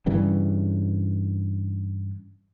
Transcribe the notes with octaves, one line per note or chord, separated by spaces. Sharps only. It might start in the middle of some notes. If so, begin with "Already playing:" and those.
G2 C#3 E3 G3